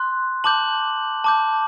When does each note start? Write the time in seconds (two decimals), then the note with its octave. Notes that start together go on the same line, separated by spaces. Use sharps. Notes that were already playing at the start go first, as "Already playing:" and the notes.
Already playing: C6 F#6
0.44 A5 D6 G6 F#7
1.24 A5 D6 G6